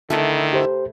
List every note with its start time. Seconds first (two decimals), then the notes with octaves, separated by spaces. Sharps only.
0.10 D3 D#3 A3 E4 B4 D5
0.53 G4 C5